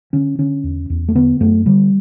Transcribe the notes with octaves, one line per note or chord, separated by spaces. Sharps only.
D3 C#4
D3 C#4
E2
E2
A3
D3 B3
F#2 A3
D3 G3